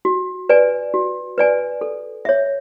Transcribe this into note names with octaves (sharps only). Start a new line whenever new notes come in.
F#4
B4 D5 G#5
F#4
B4 D5 G#5
A4
C#5 E5